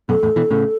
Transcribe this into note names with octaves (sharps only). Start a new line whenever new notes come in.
F#2 B2 A4
E2 A2
B2 E3
A2 C#3